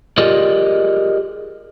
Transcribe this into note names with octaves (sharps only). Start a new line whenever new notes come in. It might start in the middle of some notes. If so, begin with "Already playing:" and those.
F4 G4 G#4 A#4 D5 D#5